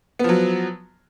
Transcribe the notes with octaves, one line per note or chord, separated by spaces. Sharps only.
F3 F#3 B3